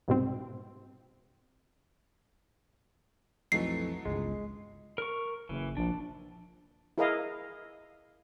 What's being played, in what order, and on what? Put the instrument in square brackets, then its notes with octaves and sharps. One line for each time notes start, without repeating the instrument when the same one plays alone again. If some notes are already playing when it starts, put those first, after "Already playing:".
[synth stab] C2 G#2 B2 C4
[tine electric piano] B1 F2 E3 [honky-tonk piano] F#3 A3 D#4 [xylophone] C7
[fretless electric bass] G1 C#2 [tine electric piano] G#3
[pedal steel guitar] A#4 C#6
[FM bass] F#1 [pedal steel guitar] E3
[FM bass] A#1 [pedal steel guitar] D4
[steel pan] E4 G#4 A#4 B4 D#5 F5